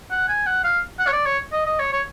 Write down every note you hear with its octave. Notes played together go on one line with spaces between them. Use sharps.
F#5
G#5
F#5
F5
F#5
C#5
D5
C#5
D#5
D#5
C#5
C#5